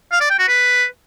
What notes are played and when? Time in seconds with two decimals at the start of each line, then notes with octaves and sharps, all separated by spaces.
0.12 F5
0.21 D5
0.30 G5
0.39 F#4
0.48 B4